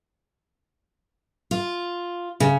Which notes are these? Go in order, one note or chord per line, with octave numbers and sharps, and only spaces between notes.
F4
C#3